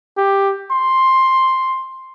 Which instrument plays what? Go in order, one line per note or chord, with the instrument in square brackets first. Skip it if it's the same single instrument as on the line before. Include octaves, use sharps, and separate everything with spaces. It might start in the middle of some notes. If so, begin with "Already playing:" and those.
[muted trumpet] G4
C6